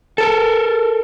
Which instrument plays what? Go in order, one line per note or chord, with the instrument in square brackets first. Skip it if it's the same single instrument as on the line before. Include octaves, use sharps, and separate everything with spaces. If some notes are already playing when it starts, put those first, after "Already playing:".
[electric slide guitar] A4 A#4